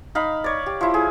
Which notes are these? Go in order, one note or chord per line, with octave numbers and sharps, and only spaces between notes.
D#4 F5 B5
C#5 D5
G4
F3 E4
G#4